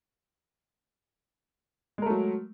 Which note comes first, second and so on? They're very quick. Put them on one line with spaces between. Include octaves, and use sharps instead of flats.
G#3 A#4 A3 F#3